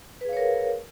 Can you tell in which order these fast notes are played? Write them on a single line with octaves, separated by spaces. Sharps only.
B4 G#4 F5 C#5 A#4